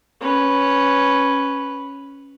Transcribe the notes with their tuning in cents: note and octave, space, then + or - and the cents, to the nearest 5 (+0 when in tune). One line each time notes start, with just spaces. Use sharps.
C#4 +0 B4 +0